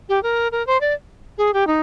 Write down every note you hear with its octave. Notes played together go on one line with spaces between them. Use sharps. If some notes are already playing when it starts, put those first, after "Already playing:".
G4
A#4
A#4
C5
D5
G#4
G4
D#4